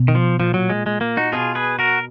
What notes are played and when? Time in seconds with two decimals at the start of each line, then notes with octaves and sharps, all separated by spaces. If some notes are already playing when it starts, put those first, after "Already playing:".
Already playing: B2
0.08 D#3
0.15 F3
0.39 A#2 F3
0.54 F#3
0.70 G#3
0.86 G#3
1.01 A#3
1.17 D#4 F#4
1.32 B2 F4 G#4
1.55 G#4 B4
1.79 F#4 A#4